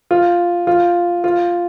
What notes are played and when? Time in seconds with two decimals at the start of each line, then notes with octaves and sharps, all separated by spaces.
0.11 F4
0.67 F4
1.24 F4